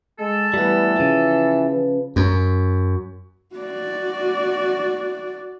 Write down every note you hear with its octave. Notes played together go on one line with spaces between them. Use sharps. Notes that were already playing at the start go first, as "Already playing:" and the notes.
G#3 A4
E3 G3 A3 B3
C#3 F3
B4
F#2
F#4 D5